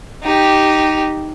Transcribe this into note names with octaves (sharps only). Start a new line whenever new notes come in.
D#4 G4